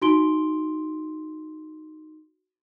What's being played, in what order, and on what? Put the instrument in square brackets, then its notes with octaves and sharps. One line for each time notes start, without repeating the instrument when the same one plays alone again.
[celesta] D#4 F#4 C6 D7 G7